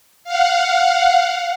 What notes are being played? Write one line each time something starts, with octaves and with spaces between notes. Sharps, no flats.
F5 F#5